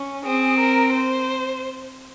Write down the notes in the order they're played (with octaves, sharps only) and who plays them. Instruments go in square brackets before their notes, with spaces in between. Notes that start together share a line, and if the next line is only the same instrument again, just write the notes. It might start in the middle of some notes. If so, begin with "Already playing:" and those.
Already playing: [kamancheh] C#4
[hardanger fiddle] C4 [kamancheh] G#4
[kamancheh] A#4
C5